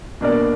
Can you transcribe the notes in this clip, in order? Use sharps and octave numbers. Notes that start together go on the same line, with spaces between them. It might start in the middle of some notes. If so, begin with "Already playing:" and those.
B2 A#3 D4 A#4 D5